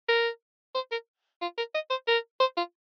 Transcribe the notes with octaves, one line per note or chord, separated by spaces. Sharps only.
A#4
C5
A#4
F4
A#4
D#5
C5
A#4
C5
F4